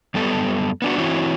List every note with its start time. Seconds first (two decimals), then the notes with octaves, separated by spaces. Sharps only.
0.14 F#2 G3 B3 A4
0.82 B3 D4 F#4
0.98 E3 C4 E4 F#4 C#5